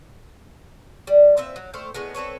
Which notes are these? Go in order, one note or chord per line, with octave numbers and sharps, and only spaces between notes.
G3
A#2 C4 B4 E5
F#3
A3 C5 F5 G5
A2 G#3 B3
C4 A4 B4 C#5